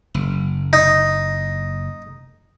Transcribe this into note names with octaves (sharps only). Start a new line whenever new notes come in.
F#1
D#4